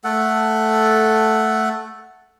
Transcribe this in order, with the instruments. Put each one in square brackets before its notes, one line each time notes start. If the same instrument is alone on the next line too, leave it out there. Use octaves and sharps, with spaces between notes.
[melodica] A3 A4 F#5